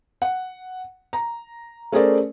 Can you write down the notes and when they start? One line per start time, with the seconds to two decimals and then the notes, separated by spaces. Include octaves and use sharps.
0.22 F#5
1.13 A#5
1.92 A3 C#4 G#4 A#4 C5 D5